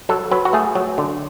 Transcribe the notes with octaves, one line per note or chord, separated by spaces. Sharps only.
F#3 A4
F#3 B4
F#4
A3 G#4
F#3
D3